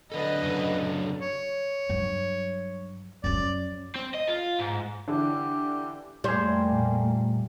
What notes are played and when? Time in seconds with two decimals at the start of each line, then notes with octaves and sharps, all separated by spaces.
0.12 F#3 D4 A4 B4 D#5
0.43 F#2 C#3
1.21 C#5
1.90 G2 F#3
3.24 F#2 F#3 D5
3.95 C4
4.14 D#5
4.27 F4
4.59 G#2
5.08 D3 E3 D4 G4
6.24 F2 G3 A3 A#3 G#4 C5
6.72 A#2